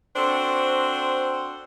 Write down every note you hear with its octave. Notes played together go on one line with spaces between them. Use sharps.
C4 D4 F#4 A4 C5